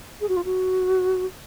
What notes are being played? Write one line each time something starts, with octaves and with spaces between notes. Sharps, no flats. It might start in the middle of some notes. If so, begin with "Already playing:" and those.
G#4
F#4
F4
F#4